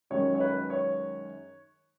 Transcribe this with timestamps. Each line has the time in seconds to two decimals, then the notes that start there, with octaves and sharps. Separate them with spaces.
0.10 F#2 D#3 G#3 C#5
0.35 C#5
0.40 B4
0.70 C#5